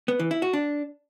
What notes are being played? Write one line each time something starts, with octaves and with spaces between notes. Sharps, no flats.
B3
E3
E4
F#4
D4